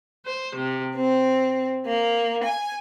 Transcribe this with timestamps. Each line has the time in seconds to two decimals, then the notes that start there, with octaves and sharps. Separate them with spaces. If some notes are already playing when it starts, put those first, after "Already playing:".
0.24 C5
0.54 C3
0.96 C4
1.86 A#3
2.43 G#5